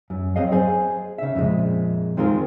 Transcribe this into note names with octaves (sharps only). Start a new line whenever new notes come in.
F#2
F#3 C4 G#4 D#5 F5
G#4 C5 G#5
C#3 E5
F2 A#2 G#3
D#3 G#3 C4 F4 G#4 A#4